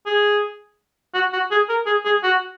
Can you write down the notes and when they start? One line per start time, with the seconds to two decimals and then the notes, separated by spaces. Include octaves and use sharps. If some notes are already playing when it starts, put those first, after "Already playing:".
0.06 G#4
1.14 F#4
1.33 F#4
1.51 G#4
1.69 A#4
1.86 G#4
2.05 G#4
2.23 F#4